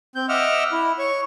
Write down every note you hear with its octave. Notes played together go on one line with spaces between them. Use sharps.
C4 G6
D#5 E5 F#5 D6 E6 F6
E4
C#5 C#6